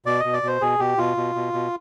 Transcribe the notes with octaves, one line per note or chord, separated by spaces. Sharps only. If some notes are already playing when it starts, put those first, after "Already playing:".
B2 D5
B2 D#5
D5
B2 C5
B2 G#4
B2 G4
B2 F4
B2
B2
B2